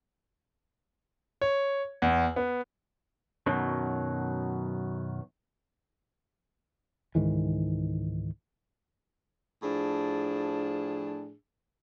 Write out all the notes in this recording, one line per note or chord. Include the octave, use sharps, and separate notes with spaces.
C#5
E2
B3
F#2 B2 D#3 F#3
C#2 G#2 D#3 E3
A2 F3 D4 G#4